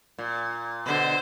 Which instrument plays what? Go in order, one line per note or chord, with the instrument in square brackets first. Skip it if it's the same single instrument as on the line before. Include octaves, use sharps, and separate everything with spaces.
[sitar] A#2
[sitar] B2 D3 [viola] C5